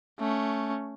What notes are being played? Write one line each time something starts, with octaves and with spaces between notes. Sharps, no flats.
A3 C#4